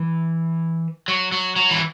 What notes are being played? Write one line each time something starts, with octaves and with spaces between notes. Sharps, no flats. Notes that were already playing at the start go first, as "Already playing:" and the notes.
Already playing: E3
F#3
F#3
F#3
E3